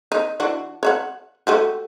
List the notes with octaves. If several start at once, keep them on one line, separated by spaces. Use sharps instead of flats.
D#4
E3 D4 F#4
C#5 E5 F#5
A3 F#4 G4